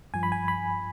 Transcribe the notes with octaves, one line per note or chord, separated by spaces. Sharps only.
G2 F3 G#5
B5
G#5
B5